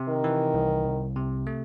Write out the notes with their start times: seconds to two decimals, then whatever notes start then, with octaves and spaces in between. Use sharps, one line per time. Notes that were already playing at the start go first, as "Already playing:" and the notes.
Already playing: C3
0.08 D#3
0.24 E3
0.54 C2
0.85 C2
1.16 C3
1.47 A3